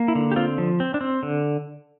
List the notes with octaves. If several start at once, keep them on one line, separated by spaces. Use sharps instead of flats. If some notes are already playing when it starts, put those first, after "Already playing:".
Already playing: A#3
E4
D3
G4
C4 F4
F3
C4
D4
C4
D3